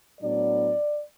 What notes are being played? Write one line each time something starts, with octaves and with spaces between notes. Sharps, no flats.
A2 F#3 B3 D4 D5